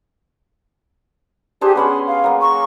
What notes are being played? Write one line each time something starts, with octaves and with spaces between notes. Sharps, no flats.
D4 G4 G#4 C5
B3 C#4 B5 C6
F5
F#3 A#3
C#6